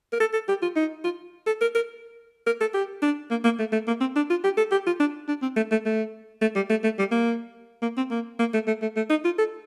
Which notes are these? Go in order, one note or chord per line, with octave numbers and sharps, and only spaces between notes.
A#4
A4
A4
G4
F4
D#4
F4
A4
A#4
A#4
A#4
A4
G4
D4
A#3
A#3
A3
A3
A#3
C4
D4
F4
G4
A4
G4
F4
D4
D4
C4
A3
A3
A3
A3
G3
A3
A3
G3
A#3
A#3
C4
A#3
A#3
A3
A3
A3
A3
D#4
F4
A4